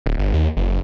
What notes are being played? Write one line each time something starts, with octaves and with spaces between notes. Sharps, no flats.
D1
G1
D#2
F#1